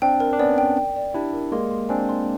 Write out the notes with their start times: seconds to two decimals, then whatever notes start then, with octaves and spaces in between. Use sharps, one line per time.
0.02 C4 D4 G5
0.20 A#4
0.33 D4
0.39 B3 C#4 D5
0.58 G5
0.77 G5
0.96 D5
1.14 D4 E4 G4
1.33 A#4
1.52 G#3 A#3 C6
1.71 C6
1.89 C4 D4 G#5
2.09 C6